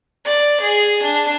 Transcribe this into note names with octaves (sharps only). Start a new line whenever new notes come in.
D5
G#4
D4